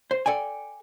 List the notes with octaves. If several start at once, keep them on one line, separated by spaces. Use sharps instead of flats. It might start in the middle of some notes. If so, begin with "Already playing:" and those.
C5
A4 D5 G5 G#5